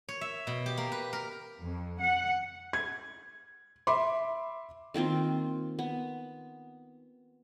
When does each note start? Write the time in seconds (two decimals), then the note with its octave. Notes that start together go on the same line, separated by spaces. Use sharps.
0.09 C#5
0.21 E5
0.47 B2
0.66 G4
0.77 A#3
0.92 B4
1.13 A#4
1.59 F2
1.99 F#5
2.73 G#6
3.87 E5 B5 C6 D6
4.94 D#3 A#3 C4 F4
5.79 B3